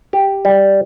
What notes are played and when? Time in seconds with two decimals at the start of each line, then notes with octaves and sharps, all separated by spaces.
0.13 G4
0.45 G3